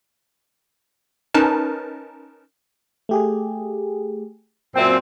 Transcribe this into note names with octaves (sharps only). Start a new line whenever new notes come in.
C#4 D#4 A#4 B4 A5
A3 G4 G#4
F#2 A#2 C4 E5 G5